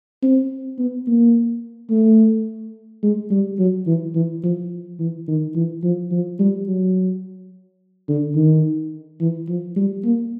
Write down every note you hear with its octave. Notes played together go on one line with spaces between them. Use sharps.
C4
B3
A#3
A3
G#3
G3
F#3
E3
E3
F3
E3
D#3
E3
F3
F3
G3
F#3
D3
D#3
E3
F3
G3
A#3